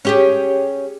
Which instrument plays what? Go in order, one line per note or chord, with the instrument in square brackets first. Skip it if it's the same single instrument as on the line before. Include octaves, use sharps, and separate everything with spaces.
[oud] C#4 G4 G#4